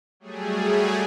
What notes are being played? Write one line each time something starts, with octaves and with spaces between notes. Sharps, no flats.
F#3 G3 A3 G#4